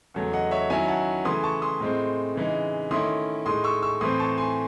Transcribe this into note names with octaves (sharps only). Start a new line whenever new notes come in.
E2 C#3 F#3 A3
D#5 F#5
C#5 E5
D#3 F#3 C#4 E4 E5 G#5
F#5 A5
C#3 E3 A3 C6 D#6
A5 C#6
C6 D#6
A2 G#3 C4
C#3 E3 G#3 D#4
D#3 A3 C#4 E4 C6 D#6
A2 G#3 D#4 C6 D#6
C#6 E6
C#6 E6
A2 E3 C4 C6 D#6
A5 C#6
G#5 C6